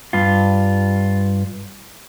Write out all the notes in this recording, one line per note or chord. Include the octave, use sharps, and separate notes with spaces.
G2 F4